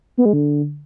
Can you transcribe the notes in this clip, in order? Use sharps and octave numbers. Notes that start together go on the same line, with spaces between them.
B3
G#3
D3